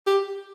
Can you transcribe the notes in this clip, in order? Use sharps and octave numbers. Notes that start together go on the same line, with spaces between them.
G4